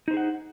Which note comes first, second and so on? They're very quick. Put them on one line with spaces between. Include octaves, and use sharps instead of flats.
D#4 C5 G#4 F#5